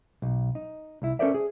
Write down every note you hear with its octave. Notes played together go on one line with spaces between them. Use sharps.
B1
D#4
C2 E4
C#4 A4 A#4 C5 D5 E5
G#4